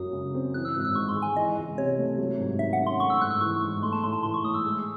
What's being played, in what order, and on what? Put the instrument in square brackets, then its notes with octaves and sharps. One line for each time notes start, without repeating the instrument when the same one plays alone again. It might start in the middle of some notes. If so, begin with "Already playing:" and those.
Already playing: [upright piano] F#2 F#3 [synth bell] D#6
[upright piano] C#3
C4
[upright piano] E3 [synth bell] F#6
[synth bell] E6
[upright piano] G#1 [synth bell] F#6
[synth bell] E6
[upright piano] G#2 [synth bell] C#6
[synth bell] C6
[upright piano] G#3
[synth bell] G#5
[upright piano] E3 [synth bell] D#5
[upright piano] C#2
[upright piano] C3 [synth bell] C#5
[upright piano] A3
F#3
G#2
[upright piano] D#3 [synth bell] E5
[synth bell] F#5
[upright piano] C#4
[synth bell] C6
[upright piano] A3 [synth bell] C#6
[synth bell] E6
[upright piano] G#2 [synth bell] F#6
[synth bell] E6
[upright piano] E3 [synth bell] C#6
[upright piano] G#2
[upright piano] A3 [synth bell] C6
[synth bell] A5
[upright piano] A2 [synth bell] C6
[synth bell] A5
[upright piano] E3 [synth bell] C6
[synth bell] C#6
[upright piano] A2 [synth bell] D#6
[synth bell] E6
[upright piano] G#3 [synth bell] E6